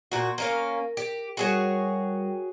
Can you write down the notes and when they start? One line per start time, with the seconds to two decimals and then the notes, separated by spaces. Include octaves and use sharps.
0.12 A#2 F#4
0.38 A#3 C#4 A#4 F5
0.97 G4
1.37 G3 F#4 G#4 A#4 C#5 G5